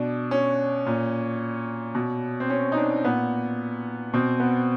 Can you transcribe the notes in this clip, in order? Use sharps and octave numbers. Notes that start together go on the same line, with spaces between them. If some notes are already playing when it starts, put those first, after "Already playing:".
Already playing: B2 D4
C#4
A#2
B2
C4
C#4
D#4
D4
A#2 B3
B2 C4
B3